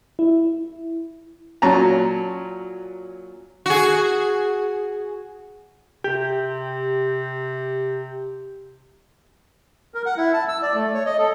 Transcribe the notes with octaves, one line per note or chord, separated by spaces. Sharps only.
E4
A#2 F#3 C#4 A5 A#5
F#4 G#4
C3 G4
A#4
F#5
E4
A5
E6
D5
A3
C#5
D#5
A4